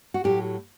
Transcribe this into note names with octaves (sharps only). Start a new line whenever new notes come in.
F#4
A2 F#3 G4